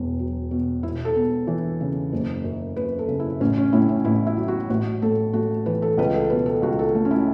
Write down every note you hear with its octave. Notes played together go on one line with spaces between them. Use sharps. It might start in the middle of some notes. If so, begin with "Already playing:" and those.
Already playing: E1 E2
F#3
B2
E1 E4
A4
E2
E3
C#3
F#1
F#2
F#1 B4
A4
C#3
E4
A1 C#4
C#4
A2 E4
C#4
A1 E4
E4
F#3
F#4
A1 F#4
A2 A4
A3 F#4
E3 B4
A4
C#2 B4
A4
B2 B4
A4
C#2 F#4
A4
A3
C#4
E4